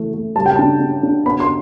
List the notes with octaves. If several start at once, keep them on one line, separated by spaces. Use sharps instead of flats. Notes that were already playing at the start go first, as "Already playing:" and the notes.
Already playing: E3 A3
A3
G3 A5
G5
D4 A5
D4
D4
B3 B5
C6